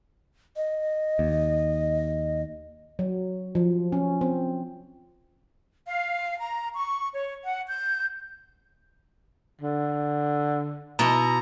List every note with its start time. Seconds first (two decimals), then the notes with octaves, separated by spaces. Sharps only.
0.56 D#5
1.19 D#2
2.99 F#3
3.55 F3
3.92 C#4
4.21 C4
5.87 F5
6.39 A#5
6.75 C#6
7.13 C#5
7.44 F#5
7.66 G6
9.61 D3
10.99 B2 E4 A#5